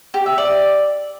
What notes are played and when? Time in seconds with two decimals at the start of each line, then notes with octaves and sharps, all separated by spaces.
0.14 G4
0.26 E5
0.38 D5